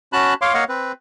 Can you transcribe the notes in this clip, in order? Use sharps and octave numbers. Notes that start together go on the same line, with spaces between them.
C#4 F#4 A5 B5 F#6
C#5 F5 C6 D6
A#3 C#5 D#5 F5 F#5
C4 B4